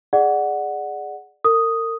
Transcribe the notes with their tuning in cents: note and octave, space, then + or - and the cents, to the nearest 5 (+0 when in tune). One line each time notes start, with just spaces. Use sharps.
G#4 +0 D5 +15 F#5 +0
A#4 -40 D#6 +0